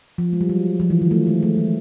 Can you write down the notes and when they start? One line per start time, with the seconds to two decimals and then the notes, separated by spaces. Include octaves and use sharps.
0.18 F3
0.33 G#3
0.41 G3
0.49 F#3
0.80 F3
0.90 E3
1.01 D#3
1.11 A3
1.27 G#3
1.43 A3
1.57 G#3